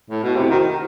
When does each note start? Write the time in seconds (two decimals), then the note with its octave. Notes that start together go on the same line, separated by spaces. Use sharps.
0.10 A2
0.24 B2
0.36 C3 E4
0.50 D#3 F#4